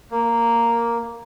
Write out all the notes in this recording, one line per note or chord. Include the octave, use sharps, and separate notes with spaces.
A#3